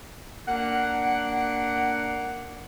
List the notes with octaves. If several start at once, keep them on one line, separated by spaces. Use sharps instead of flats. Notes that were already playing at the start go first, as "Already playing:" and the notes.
A#3 D4 F#5